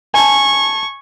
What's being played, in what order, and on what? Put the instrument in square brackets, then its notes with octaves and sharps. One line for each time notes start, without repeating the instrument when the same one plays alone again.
[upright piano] G#5 A5 [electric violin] C#6